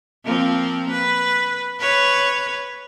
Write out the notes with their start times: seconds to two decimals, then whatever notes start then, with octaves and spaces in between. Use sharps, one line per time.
0.25 F3 A#3 C4
0.90 B4
1.79 B4 C#5